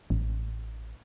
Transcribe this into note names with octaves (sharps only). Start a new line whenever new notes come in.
A1